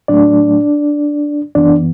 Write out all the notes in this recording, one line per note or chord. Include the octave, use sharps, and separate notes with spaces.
A2 F#3 A3 D4 D5
F#2 E3 B3 D4 D5